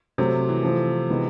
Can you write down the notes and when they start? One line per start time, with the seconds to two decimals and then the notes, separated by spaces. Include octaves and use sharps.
0.18 C3 F#3 A3 C4
0.49 E3
0.63 E3 F3 A3 C4
1.10 C3 E3 G#3 B3 D#4